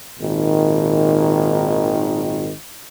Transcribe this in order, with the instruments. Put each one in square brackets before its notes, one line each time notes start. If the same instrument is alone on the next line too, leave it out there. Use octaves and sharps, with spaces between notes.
[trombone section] G#1 A#2 D#3